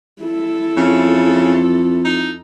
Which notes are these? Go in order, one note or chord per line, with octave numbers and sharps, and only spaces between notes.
E4 A4
F2 C#3
D#4